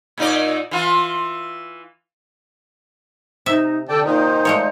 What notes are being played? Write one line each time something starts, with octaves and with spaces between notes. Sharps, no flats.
A#2 D#4 D5
E3 F4
C3 D#4 E5
D3 A4 D5 G5 A5
A#2 D#3 D#4 C5
G#3 A3 C#5